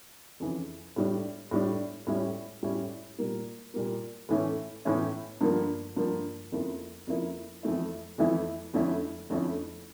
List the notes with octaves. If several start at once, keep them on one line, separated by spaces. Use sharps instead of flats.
F2 C#3 E3
A2 G3 D4
A2 G3 D4
A2 G3 C#4 E4
A2 G3 C#4 E4
A#2 G3 A#3
A#2 G3 A#3
A2 E3 A3 C#4 E4
A2 E3 A3 C#4 E4
G2 D3 F3 A#3
G2 D3 F3 A#3
F2 C#3 F3 A#3 E4
F2 C#3 F3 A#3 E4
F2 E3 A3 E4
F2 E3 A3 E4
F2 D3 A3 C#4 E4
F2 D3 A3 C#4 E4